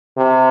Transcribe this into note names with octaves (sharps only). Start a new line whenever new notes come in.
C3